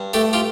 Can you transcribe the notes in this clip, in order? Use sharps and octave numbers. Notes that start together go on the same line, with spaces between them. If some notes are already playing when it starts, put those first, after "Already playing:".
Already playing: G2
A3 G4 A4
F4 G4